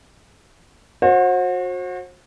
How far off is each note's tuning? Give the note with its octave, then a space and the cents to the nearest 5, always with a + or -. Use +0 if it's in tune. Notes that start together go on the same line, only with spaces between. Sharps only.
F#4 -30 C5 +35